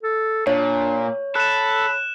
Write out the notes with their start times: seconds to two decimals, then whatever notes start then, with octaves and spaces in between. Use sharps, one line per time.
0.03 A4
0.47 A#2 D4 C#5
1.35 A4 B5 F#6 E7